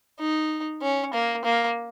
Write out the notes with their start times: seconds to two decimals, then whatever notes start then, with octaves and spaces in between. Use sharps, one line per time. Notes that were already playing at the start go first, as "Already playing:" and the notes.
0.19 D#4
0.82 C#4
1.13 A#3
1.44 A#3